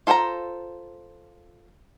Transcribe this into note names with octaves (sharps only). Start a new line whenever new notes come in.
F4 A4 C5 G5 A#5